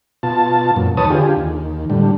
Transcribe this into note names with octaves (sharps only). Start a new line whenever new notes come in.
B2 F4 A5
F#2 A#2
D#2 B4 C#5 A5 D#6
D3 F4 G4 G#4
D#2
A2 D3 G3